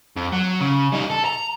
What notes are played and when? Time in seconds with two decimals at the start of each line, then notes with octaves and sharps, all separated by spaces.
0.16 F2
0.32 F#3
0.60 C#3
0.92 G3 D#4
1.10 A4
1.25 A#5